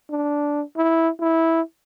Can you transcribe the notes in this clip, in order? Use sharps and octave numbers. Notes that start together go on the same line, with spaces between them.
D4
E4
E4